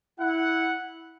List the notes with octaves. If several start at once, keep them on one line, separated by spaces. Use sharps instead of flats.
E4 F#5